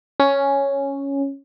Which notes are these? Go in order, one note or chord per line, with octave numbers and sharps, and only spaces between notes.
C#4